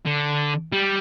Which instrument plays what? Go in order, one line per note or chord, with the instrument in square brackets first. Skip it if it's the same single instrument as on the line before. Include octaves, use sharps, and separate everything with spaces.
[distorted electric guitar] D3
G3